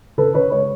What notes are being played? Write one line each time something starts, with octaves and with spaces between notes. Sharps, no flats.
C#3 A4 B4
C#3 B4 C#5
G#3 B4 C#5